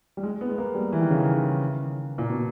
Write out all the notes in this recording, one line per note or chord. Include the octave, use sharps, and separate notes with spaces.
G3
G#3
B3
G#3
A#3
G3
E3
D#3
C#3
D#3
A#2
B2